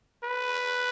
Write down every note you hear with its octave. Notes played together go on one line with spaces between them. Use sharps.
B4